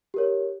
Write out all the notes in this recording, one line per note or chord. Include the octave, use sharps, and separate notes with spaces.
G4 A#4 C#5